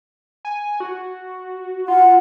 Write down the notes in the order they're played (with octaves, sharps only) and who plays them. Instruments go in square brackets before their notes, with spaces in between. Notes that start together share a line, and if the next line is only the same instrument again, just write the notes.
[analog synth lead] G#5
F#4
[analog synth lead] F4 [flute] F#5